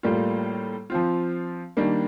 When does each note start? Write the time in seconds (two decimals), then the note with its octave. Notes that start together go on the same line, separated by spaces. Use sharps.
0.03 A2 G3 A#3 F4
0.90 F3 C4 F4
1.77 D#3 G3 A#3 D4